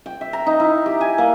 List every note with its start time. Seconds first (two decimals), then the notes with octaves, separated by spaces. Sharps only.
0.06 G5
0.21 E5
0.33 A#5
0.46 D#4
0.60 E4
0.86 G4
1.01 G#5
1.18 A#3